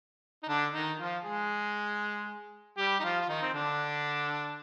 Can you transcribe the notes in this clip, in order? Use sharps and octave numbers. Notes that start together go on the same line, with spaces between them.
D#4
D3 D4
D#3 D#4
F3 F4
G#3 G#4
G3 G4
D#4
F3 F4
F4
D#3 D#4
C4
D3 D4